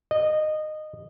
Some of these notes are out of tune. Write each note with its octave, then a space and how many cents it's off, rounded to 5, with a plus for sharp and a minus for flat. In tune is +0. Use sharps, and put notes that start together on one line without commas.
D#5 -15